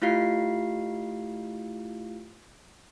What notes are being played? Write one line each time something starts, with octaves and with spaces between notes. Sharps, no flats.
A3 E4 F4 G4 F5 C7